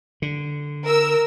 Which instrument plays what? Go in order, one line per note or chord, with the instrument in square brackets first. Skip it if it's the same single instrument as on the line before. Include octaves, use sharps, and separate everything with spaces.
[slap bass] D3
[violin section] A#4 E6